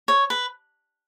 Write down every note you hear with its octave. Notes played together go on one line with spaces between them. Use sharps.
C#5
B4